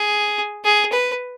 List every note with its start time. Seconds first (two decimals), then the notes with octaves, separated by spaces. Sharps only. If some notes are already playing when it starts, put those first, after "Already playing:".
Already playing: G#4
0.65 G#4
0.93 B4